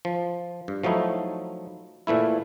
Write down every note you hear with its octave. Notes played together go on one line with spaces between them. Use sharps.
F3
G2
F3 F#3 A3 D#4 E4
A#2 E3 A3 E4